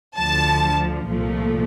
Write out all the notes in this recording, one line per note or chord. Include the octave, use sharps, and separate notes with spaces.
D2 D3 F3 A5
C2 A#2 F3 A3